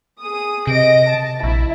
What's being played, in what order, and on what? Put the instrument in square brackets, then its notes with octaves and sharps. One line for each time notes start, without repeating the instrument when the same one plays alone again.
[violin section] G#4 D#6
[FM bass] C3 [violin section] D#5 A#6 D7
[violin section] A5
[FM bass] A#1 [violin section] E4